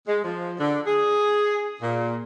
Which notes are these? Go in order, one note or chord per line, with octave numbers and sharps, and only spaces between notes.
G#3
F3
D3
G#4
A#2